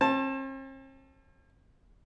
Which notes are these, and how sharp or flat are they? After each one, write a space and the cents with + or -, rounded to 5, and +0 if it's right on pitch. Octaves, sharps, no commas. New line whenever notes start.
C4 +45 A5 +0